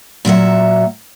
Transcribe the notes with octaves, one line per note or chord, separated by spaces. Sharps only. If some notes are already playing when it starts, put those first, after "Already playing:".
A#2 F#3 E5 F#5